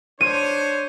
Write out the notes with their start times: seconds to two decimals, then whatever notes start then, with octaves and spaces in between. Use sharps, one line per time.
0.21 D4 C5 C#5 D#7